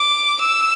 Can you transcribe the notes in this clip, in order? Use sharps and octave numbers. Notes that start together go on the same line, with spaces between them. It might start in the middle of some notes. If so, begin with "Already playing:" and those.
Already playing: D6
E6